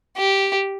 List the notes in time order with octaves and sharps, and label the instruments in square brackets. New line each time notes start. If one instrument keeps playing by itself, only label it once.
[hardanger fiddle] G4